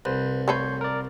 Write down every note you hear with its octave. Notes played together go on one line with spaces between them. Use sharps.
C2 B4 C5
A3 A4 B4 C#5 C6 G6
A#4 D5